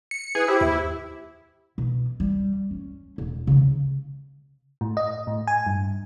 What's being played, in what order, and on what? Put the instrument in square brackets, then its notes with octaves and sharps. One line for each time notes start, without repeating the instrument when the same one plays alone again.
[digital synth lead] C#7
[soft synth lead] E4 [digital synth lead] G#4 [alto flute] B4
[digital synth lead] E4 [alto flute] G4 [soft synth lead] C5
[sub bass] D#2 [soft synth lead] G4 [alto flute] E5
[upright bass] B2
G3
C#4
E1
C#3 B3
[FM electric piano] A2
D#5
A2
G#5
G2